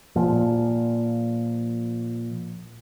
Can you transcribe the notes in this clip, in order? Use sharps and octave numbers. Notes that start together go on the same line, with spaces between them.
A#2 F3